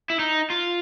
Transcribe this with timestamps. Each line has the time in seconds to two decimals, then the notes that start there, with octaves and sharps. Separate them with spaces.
0.10 E4
0.19 D#4
0.50 F4